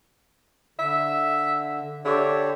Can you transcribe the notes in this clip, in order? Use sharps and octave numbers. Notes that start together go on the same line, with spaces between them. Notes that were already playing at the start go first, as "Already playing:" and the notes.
D3 E5
D3 G4 C#5 E5